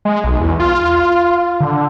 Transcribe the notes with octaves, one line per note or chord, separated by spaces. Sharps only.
G#3
B1
E2
F4
D3